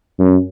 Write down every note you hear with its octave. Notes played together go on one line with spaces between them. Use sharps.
F#2